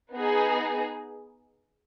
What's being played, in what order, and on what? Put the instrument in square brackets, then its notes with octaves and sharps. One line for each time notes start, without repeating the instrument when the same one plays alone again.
[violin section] B3 D#4 G#4